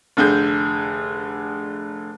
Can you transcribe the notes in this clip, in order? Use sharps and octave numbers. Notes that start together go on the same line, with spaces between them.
F1 D3 G#4 G6